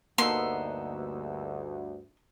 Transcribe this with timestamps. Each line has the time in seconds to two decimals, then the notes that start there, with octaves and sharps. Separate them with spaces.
0.18 D2 G2 A#3 B3 D#4 C6 E6